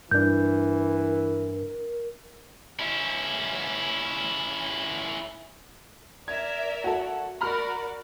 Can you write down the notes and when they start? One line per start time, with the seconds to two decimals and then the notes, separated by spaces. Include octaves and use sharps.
0.11 G2 E3 D4 A#4 G6
2.79 C#4 E4
6.28 A#4 D5 E5 G#6
6.84 F#4 A4
7.41 F#4 A#4 D5 A#5 B5 F6